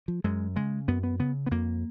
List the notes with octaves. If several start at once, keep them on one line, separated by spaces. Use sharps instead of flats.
F3
F#2 G#3
C#3 G#3
F#2 B3
B3
C#3 B3
B3
F2 A#3